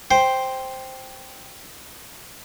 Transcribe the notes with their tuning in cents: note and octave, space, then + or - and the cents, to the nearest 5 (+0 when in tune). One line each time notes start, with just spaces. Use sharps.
C5 +0 G5 +0